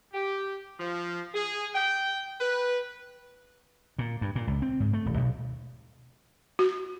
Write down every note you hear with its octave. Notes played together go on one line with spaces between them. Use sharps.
G4
F3
G#4
G5
B4
A#2
G2
A#2
C#2
C4
G#2
A3
D#1
B1
F#4